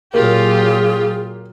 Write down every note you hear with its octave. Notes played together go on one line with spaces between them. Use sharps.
A#2 F#3 A#3 F4 G4 G#4